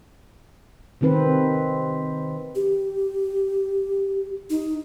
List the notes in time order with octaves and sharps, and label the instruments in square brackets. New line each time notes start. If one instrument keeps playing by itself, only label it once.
[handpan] C3 D#3 C4 B4
[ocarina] G4
D#4